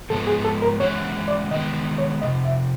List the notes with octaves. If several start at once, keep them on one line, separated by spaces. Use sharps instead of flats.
G#2 F3 G#3 B3 A4
G#4
A4
A#4
E3 G#3 C#4 F#4 C#5
D5
D#3 G#3 B3 D#5
C#5
F2 C3 D#5
E5